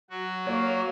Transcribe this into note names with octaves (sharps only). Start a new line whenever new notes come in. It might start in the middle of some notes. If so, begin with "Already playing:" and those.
F#3 F#4
A#3 C#5